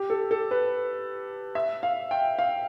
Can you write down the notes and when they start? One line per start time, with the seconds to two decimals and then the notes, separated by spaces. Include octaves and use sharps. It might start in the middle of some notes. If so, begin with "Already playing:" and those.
Already playing: G4
0.10 A4
0.31 A4
0.51 B4
1.55 E5
1.83 F5
2.11 G5
2.39 F5